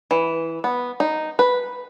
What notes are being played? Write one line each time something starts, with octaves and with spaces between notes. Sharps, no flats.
E3
B3
D#4
B4